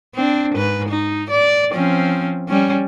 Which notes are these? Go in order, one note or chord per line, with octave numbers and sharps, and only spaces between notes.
C4 D4
G#2 B4
D#4
D5
F3 C4 C#4
G3 C#4